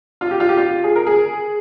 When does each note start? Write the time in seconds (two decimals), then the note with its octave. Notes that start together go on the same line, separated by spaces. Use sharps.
0.21 F4
0.31 G4
0.40 F4
0.49 G4
0.57 F4
0.84 G#4
0.96 A#4
1.07 G#4